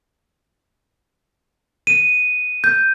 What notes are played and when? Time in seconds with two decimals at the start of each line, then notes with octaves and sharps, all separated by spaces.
1.87 D#7
2.64 G6